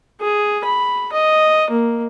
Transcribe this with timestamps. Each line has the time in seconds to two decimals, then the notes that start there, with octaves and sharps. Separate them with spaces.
0.21 G#4
0.65 B5
1.13 D#5
1.70 A#3